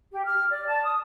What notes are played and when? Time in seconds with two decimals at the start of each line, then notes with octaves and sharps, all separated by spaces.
0.13 G4
0.25 F6
0.50 D5
0.67 A5
0.83 D#6